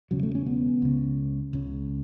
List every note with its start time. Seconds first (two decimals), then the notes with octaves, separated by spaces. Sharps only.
0.11 E1 E2 C#3 F#3
0.23 A3
0.35 C#4
0.46 B3
0.82 C#2 C#3
1.53 C#2 C#3